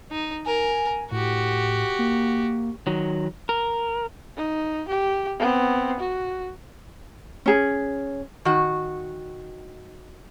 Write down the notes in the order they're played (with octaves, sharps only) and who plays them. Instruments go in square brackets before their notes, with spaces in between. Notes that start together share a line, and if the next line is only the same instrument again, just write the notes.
[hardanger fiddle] D#4
[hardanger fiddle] A#4 [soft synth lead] G#5
[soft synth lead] A2 [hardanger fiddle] F#4 G4
[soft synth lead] A#3
[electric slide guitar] D#3 F#3
A#4
[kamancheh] D#4
G4
B3 C4
F#4
[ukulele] C#4 G#4
[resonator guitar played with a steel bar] D#3 F#4